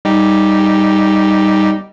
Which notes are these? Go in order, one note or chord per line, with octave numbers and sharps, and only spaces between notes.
G3 D#4 G4